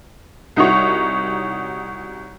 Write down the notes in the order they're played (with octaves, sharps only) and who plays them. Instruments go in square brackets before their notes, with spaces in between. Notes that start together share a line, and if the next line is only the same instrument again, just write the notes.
[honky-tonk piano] C2 D#4 F#4 C#5